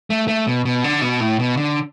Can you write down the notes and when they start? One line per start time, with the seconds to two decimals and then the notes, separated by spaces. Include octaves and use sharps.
0.10 A3
0.28 A3
0.47 B2
0.65 B2
0.84 D3
1.01 B2
1.20 A2
1.39 B2
1.57 D3